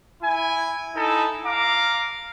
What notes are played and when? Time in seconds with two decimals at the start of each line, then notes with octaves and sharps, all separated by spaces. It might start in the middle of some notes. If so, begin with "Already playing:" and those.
0.23 E4 G#5
0.96 D#4 E4 A4
1.46 F5 A#5 D6